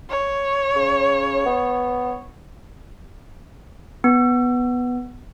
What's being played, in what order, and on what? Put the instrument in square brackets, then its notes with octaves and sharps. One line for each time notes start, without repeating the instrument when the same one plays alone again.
[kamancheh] C#5
[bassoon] C#3
B3
[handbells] B3